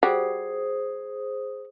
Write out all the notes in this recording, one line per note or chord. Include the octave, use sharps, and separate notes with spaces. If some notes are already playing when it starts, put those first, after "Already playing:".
G3 F#4 G#4 C5 D#6